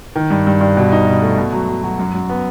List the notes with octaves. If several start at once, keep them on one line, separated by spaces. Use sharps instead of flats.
D#3
G2
G2
G2
B2
D#4
B2
A3
B2
F#3
F#3
F#3
F#2
F#2
B3